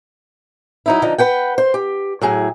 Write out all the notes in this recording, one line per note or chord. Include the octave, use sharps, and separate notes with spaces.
F#3 D#4 E4
D3 F3 D#4
B4 F#5 G5
C5
G4
A2 F#3 G#4